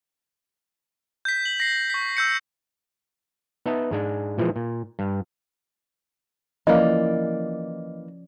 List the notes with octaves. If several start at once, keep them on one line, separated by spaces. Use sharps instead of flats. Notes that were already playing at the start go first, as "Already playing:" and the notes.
G6 B6
F#7
A#6 C7
C#6 B6
E6 G6 C#7
B3 D#4 D#5 E5 A5
G#2 G#3 D4
A#2 E3 F3 G#3
A#2
G2
E3 F3 A#3 C#4 D5 D#5